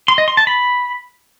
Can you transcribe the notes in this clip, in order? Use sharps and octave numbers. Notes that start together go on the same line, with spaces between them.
C6
D#5
C6
A5
B5